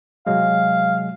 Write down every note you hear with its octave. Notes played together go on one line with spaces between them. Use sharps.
C3 F#3 G#3 F5